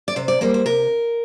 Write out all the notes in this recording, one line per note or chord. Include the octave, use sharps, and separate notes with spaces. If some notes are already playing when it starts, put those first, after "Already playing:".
D5
C3 C5
D5
G3 A#3 C5
C5
C3 A#4